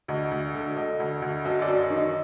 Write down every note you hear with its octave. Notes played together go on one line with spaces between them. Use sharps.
D2 D#5
D2
D3
D3 D#5
D2
D2
F#2 D#5
D5
F#2
D#5
D#3
D#5